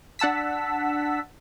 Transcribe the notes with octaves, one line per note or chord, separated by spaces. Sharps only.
D4 F#5 A5 E6 B6